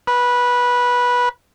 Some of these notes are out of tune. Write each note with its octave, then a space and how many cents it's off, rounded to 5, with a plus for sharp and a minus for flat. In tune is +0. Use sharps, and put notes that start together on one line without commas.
B4 -15